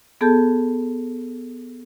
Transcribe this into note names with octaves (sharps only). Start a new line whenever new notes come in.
B3 G#4 A4 A5 G6